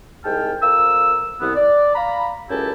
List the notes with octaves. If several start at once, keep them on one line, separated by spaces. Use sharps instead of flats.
C2 G#2 G#3 G5 A5 F6
F2 A#4 F5 E6
C2 B3
D5
F5 A#5 B5
C#2 F#2 C#4 E4 G4 A4